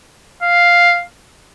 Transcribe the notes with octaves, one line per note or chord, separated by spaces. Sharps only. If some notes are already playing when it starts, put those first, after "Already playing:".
F5